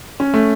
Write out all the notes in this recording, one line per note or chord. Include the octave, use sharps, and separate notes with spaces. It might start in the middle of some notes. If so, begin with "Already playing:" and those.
C#4
A3